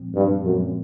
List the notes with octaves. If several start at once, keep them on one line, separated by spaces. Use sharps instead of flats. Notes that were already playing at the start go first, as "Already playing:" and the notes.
Already playing: A#2 F3 G#3 C4
G2
F#2 A#2 F3 G#3 C4